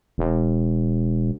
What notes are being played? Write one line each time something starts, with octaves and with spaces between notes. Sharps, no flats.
E1